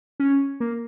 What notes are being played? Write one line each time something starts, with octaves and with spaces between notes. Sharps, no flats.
C#4
A#3